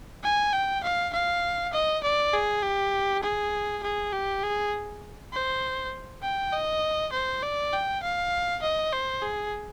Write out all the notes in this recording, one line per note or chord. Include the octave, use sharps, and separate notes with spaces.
G#5
G5
F5
F5
D#5
D5
G#4
G4
G#4
G#4
G4
G#4
C5
G5
D#5
C5
D5
G5
F5
D#5
C5
G#4